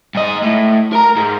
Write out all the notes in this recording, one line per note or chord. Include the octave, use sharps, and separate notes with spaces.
G#2 D#5
A2
A#4 A#5
G#2